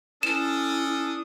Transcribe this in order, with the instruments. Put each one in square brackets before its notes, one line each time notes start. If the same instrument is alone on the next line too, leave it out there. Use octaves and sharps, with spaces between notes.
[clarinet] C#4 [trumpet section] D4 A4 D#6 [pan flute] E4 [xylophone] E7